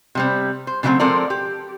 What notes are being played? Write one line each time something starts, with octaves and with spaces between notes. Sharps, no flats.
C3 G3 C4
C5
C#3 E3 F#3 G#3 A3 C4
F3 G#3 C4 A4 A#4 D5
G4